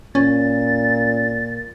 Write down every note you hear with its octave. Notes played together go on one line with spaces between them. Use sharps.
A#2 C#4 A6